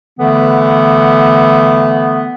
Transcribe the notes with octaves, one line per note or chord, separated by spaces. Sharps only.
D3 E3 A3 B3